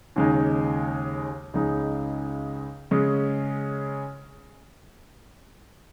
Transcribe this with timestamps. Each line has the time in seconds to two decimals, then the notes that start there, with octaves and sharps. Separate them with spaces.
0.16 D#2 C#3 G#3 D#4
1.54 C#2 C#3 G#3 D#4
2.91 C#3 G#3 C#4